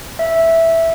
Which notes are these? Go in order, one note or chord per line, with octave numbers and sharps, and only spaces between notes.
E5